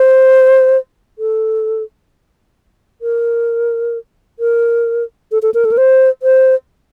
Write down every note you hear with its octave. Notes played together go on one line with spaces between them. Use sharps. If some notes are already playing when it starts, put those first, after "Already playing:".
Already playing: C5
A4
A#4
A#4
A4
A4
A#4
A4
A#4
C5
C5